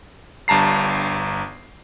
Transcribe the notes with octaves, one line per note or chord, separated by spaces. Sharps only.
G1 G2 A5 A#5 C7